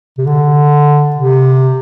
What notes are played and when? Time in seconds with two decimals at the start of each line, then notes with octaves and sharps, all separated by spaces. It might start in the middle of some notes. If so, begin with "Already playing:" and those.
0.18 C3
0.26 D3
1.16 C3